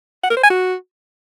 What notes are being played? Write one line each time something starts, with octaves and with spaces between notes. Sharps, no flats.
F#5
A#4
C5
G#5
F#4